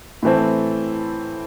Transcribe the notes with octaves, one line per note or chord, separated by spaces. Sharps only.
A2 E3 A3 C4